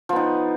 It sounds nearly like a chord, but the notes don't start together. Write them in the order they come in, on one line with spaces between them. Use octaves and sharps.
F3 B3 D#4